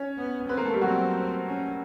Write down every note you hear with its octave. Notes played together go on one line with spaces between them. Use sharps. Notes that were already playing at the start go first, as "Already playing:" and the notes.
Already playing: C#4 C#5
B3
B3 C4 B4
A#3 A#4
A3 A4
G3 G4
F#3 C4 F#4
C#4